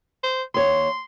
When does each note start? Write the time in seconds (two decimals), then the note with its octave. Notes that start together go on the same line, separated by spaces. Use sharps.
0.23 C5
0.54 D#2 C#5 C6